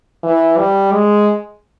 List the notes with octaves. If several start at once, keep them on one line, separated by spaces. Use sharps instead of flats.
E3
G3
G#3